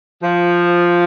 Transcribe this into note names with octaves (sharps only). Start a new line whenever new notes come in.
F3